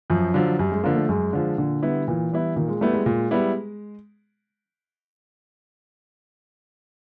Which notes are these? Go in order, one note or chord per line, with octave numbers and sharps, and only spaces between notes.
F#2 F3
D3 F3 F#3
F#2 G3
G#3
D3 F3 A#3
A3
F#2 G#3
D3 F3
A#2 D3
G3 B3 E4
A#2 E3
G3 B3 E4
A#2 D#3
G#3
G3 A3 B3 E4
G#3
A#2
G3 B3 E4